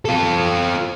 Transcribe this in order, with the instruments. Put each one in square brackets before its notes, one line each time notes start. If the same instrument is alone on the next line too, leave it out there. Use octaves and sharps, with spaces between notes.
[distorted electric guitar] F4 A4